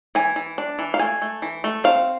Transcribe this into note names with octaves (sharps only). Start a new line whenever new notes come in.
E3 G#5
E3
D4
E3
F5
A3 G#5
A3
E3
A3
C4 F5